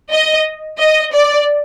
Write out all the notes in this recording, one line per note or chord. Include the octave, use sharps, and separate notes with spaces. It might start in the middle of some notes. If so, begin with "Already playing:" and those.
D#5
D#5
D5